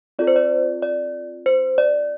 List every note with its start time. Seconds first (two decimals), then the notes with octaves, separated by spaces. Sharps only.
0.19 C4 F4 A4 D5
0.27 C5
0.36 D5
0.82 D5
1.46 C5
1.78 D5